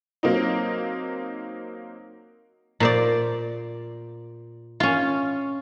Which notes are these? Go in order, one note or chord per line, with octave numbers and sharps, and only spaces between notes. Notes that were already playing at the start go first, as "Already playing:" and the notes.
F#3 A#3 C4 D#4
A#2 C5 D5
C#4 F4